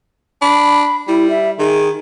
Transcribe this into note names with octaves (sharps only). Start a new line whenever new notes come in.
D4 B5
G3 E4
E5
D#3 G#4